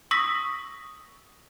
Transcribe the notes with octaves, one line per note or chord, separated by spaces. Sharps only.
C#6 D#6 E6 A#6 B6